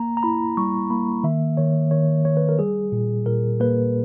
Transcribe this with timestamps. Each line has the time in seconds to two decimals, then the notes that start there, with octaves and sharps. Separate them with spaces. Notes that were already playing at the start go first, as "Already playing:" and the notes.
Already playing: A#3 A#5
0.17 A#5
0.23 E4 B5
0.57 G3 C#6
0.90 A#3 B5
1.24 D#3 E5
1.57 D#3 C#5
1.91 D#3 C#5
2.25 D#3 C#5
2.37 B4
2.49 A#4
2.59 G3 G#4
2.92 A#2
3.26 A#2 A#4
3.60 A#3 B4